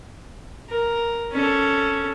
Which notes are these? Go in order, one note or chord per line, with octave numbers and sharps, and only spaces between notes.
A#4
C#4 A4